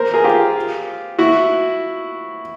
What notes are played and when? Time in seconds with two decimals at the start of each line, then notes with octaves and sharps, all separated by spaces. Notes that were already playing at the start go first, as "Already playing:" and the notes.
Already playing: A#4 C5
0.14 G#4 A#4
0.24 F4 G4
1.19 E4 F#4